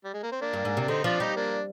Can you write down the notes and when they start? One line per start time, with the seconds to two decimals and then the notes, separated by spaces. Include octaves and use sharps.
0.04 G3
0.13 G#3
0.23 A#3
0.32 C4
0.41 A#3 D4
0.53 G2
0.65 G#2
0.77 C3 D4
0.88 D3 C4 D#4
1.04 F3 D4 F4
1.20 G3 D#4 G4
1.36 A#3 D4